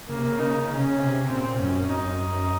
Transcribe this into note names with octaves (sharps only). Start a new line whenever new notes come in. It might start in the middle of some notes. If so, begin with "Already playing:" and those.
C#3 A#3
C3
C#3
C#3 D#4
C#3 C#4
C3
C#3
C3
A#2 C4
F#2 C#4
F#2 D#4
F#2